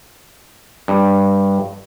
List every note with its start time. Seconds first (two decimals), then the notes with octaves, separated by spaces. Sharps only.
0.88 G2